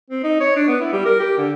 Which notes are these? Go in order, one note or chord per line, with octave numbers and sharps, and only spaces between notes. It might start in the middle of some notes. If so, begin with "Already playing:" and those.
C4
D#4
C#5
D4
B3
E4
G3
A#4
G4
D3